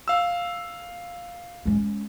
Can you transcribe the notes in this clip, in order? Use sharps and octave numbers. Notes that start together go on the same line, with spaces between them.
F5 E6
G#3 C#4